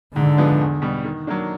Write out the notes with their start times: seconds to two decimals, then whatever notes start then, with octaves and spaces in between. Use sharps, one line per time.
0.16 G#2 D3
0.37 F3 G#3 B3 D4
0.60 E2
0.82 B2 G3
1.04 D#3
1.27 F#3 A#3 D4